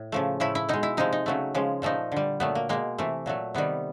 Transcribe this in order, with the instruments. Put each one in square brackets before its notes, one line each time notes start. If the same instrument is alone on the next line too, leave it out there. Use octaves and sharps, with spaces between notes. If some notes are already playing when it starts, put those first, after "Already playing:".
Already playing: [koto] A2
C#3 F3 A3
A2 F3 A3 E4
E4
B2 G#3 D#4
E4
C3 F3 G#3 D#4
D#4
C#3 F#3 A3
C#3 F3 G#3
A#2 F3 A3 D#4
D3 G3
A#2 F#3 A3 B3
A#3
B2 G#3 A#3
C3 E3 A3
A#2 F#3 A3
C3 D#3 G3 B3